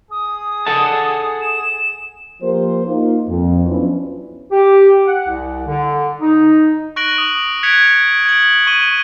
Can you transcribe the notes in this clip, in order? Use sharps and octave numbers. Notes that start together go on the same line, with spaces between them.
G#4 D#6
A4 F#5 A5
E7
F3 A#3 G4 A#4 C5
A#3 D#4 F4
F2
F3 F#3 B3 C#4 D4 E4
G4
F#5
C2
D3
D#4
C#6 F#6 A#6 D7 F#7
D#6
F#6 G#6 B6 C#7 D7 F7
G#6 D7 F#7
C#6 D#7 G7